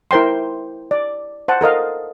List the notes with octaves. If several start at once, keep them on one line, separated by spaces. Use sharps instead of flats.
E4 A#4 C5 G5 C6
D5
C5 F#5 A5
A4 A#4 D#5 F5